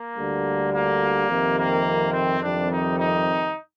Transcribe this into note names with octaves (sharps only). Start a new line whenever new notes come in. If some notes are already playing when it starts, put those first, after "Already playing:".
Already playing: A#3
D2 D3 G3
A#3
F2 C3 D#3 G3
A#3
C4
F2 C3 D#3 G3 D4
D#4
D#4